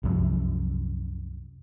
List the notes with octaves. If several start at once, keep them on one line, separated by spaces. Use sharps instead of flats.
C2 F#2 F3 F#3